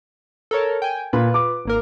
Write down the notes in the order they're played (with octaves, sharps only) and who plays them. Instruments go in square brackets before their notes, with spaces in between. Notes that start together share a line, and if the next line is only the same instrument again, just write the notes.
[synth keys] A4 A#4 C#5
G5 G#5
[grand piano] A#2 [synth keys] F4 B4
[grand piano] D6
[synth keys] G#1 A#3 A#4